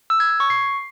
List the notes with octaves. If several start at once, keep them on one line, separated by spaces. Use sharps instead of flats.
E6
G#6
G#6
C#6
C7